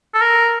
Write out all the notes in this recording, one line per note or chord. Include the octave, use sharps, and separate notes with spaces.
A4
A#4